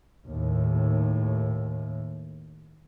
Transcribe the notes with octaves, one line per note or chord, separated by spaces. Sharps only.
D#2 A2